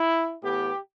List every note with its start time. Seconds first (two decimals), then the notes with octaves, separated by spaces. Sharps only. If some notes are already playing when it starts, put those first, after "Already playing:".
Already playing: E4
0.43 A2 E3 B3 G4